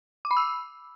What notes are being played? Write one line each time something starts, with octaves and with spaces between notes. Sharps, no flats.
D6
B5
E6